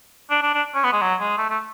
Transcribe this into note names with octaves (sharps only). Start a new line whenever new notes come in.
D4
D4
D4
C#4
B3
G#3
F#3
G#3
A3
A3